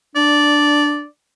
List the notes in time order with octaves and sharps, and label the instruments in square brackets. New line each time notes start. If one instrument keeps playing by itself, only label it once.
[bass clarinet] D4 [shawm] D5